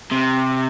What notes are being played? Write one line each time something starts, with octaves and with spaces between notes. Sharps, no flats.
C3